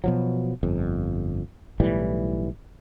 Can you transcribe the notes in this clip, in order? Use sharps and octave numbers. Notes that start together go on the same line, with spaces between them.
B2 F3 F#3
G1 F2
B1 A2 E3 G3